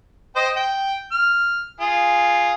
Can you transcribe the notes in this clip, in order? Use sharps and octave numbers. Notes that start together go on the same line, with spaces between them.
C5 D#5 G5
G5
F6
F4 G#4